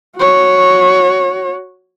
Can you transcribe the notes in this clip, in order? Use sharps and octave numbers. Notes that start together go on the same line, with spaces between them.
F#4 C#5